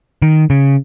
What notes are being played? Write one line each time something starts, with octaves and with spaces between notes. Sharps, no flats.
D#3
C#3